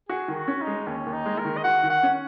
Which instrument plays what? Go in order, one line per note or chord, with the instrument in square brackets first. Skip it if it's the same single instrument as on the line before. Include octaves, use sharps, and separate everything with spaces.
[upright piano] F#4 [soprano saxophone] G#4
[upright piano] D#3
[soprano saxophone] F#4
[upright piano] C#4
[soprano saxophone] D#4
[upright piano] G#3
[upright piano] D#2 [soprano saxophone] C#4
[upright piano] D#2
[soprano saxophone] D#4
[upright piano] G#3
[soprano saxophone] A#4
[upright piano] D#3
[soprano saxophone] D#5
[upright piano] F#4 [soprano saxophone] F#5
[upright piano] D#3
[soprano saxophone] F#5
[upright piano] C#4